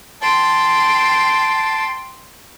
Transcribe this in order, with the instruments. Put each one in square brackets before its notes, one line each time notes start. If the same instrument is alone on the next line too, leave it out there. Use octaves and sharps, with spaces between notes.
[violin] G5 C6 [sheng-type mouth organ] A5